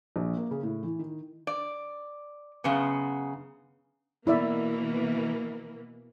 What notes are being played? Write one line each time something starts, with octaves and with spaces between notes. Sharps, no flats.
A#1
A#3
C#3
A2
E3
D#3
D5
F#2 C#3 B3
B2 E3 A#3 E4 D5 E5